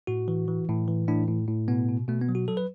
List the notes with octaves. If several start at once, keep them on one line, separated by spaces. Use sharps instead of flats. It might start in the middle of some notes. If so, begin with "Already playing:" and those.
A2 F#4
E3
E3
A2
E3
A2 D4
A2
A2
B2 B3
B2
B2 A3
B3
F#3
F#4
F#3 A4
B4